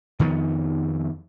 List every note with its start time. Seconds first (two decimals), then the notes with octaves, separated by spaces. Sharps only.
0.19 F2 D#3 F3 B3